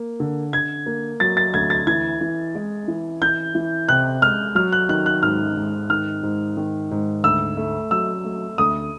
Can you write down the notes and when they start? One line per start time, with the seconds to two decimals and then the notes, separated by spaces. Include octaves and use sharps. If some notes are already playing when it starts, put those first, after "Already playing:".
Already playing: A#3
0.20 D3
0.53 D3 G#6
0.86 A#3
1.20 F#3 A6
1.37 A6
1.54 D2 G#6
1.70 A6
1.87 E3 G#6
2.21 E3
2.55 G#3
2.88 E3
3.22 E3 G6
3.55 E3
3.89 C3 F#6
4.22 G#3 F6
4.55 F#3 F6
4.72 F#6
4.89 D#3 F#6
5.06 F#6
5.23 G#2 F6
5.57 G#2
5.90 D#3 F6
6.23 G#2
6.57 D#3
6.91 G#2
7.24 D2 E6
7.57 A3
7.91 F#3 E6
8.25 A3
8.58 D2 D#6